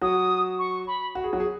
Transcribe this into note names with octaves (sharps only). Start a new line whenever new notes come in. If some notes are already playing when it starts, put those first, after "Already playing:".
F#3 F#4 D#6
C#6
B5
F#4
G#4
F#3 F#4
G#4